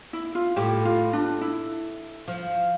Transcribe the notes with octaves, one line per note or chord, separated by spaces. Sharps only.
E4
F4
A2 G4
F4
D4
E4
F3